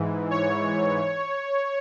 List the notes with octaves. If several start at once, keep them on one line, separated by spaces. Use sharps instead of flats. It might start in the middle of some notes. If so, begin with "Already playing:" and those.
Already playing: G#2 E3
C#5